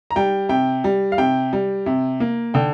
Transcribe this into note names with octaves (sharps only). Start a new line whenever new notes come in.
A#5
G3 G5
C3 G5
G3
F5
C3 G5
G3
C3
A#3
D3 G5